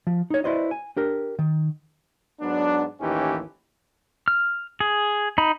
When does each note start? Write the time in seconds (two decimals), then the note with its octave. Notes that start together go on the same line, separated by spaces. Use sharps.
0.07 F3
0.30 D#4 C#5
0.44 E4 F#4 B4 C5 D5 D#5
0.71 G#5
0.97 D4 G4 A#4
1.39 D#3
2.41 G#2 F#3 B3 D4
3.01 A1 D#2 E3 C#4 D#4 G4
4.28 F6
4.80 G#4
5.38 D#4 B5